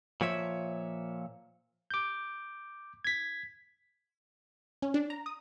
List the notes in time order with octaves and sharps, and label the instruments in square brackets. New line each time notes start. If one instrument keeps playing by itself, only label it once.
[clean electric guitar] A#2 F3 C#5 E5
[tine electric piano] D6 G6
G#6 B6
[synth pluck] C#4
D4
A#5
D#6